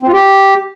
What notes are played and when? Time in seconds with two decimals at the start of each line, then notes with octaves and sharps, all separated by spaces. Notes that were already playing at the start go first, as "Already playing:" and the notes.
0.03 C4
0.08 F4
0.13 G4